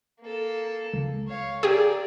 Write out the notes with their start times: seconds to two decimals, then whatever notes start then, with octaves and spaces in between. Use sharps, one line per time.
0.21 A#3 A4
0.94 C#2
1.28 C#5 F5
1.63 G4 G#4 A#4 D5